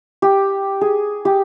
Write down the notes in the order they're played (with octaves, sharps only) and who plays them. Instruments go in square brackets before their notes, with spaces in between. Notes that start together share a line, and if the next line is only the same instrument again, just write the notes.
[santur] G4
G#4
G4